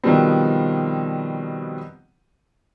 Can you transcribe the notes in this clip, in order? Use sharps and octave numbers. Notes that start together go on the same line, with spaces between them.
B2 D#3 F3 G3 B3 C4